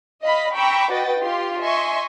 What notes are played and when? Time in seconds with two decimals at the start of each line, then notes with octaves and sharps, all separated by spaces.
0.23 D#5 F5 B5
0.55 G5 A#5 B5 C#6 D6 E6
0.91 F#4 B4 D#5 G5 A6
1.21 F4 G4 C6
1.61 D#5 E5 G#5 C6 C#6